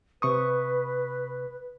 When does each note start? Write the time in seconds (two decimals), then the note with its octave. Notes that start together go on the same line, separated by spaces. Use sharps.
0.22 C3 B4 C#6 D#6